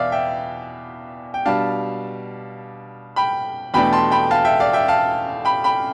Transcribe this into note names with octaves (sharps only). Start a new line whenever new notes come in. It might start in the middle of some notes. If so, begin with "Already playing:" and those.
Already playing: E2 B2 B3 D5 E5 F5
E5 G5
G5
B2 G3 D4 F5 A5
G5 B5
E2 B2 A3 D4 G5 B5
A5 C6
G5 B5
F5 A5
E5 G5
D5 F5
E5 G5
F5 A5
G5 B5
G5 B5